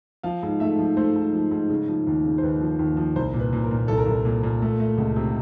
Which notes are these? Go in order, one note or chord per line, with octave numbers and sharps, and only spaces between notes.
F3 F5
G#2
A3 E5
F3
A3 C5
G#2
F3
G#2
C#3
F3
D#2
C#3
C5
D#2 B4
F3
D#2
F3
C2 C5
A#2
B4
A#2
A#4
A#2
C2 A4
A#4
C2 A4
A#2
A#2
A3
A3
C#2
C3